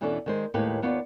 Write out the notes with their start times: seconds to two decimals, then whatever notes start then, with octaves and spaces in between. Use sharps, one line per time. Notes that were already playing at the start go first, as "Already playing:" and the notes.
0.01 E2 B2 E3 C#4 D4 A4
0.26 D#3 G#3 C5
0.54 D#2 A2 G#3 A#3 G4 B4
0.82 D#2 B3 F4 C#5 D5